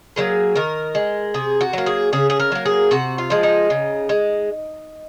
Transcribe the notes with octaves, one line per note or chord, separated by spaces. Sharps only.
F#3 A#3 G#4
D#3 A#4
G#3
C3 G#4
F#4
F#3 A#3
G#4
C#3 G#4
G#4
A#4
F#3 A#3
G#4
C3 F#4
F4
F3 G#3
D#4
C#3
G#3